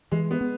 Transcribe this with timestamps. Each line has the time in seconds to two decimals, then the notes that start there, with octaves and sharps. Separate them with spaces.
0.12 E3 G#3
0.31 B3
0.41 B3